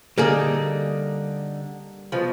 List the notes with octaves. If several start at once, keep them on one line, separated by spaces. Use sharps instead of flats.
D3 G3 A#3 D#4 G#4
B2 F3